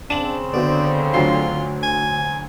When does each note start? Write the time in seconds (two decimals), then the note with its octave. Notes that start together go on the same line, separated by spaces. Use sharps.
0.10 C#3 C4 D4 E7 F#7
0.54 D3 B3 F#4 C5 D5
1.14 D2 F#3 F4 C7
1.83 G#5